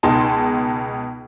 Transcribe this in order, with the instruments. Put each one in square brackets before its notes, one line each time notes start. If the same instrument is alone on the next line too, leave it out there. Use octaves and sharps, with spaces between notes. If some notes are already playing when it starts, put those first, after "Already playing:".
[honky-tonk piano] C#2 B2 D#4 G#4 A5 C6